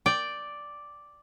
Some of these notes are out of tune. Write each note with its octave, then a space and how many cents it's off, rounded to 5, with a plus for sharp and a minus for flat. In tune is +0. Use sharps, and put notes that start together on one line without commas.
D5 +0 G5 +0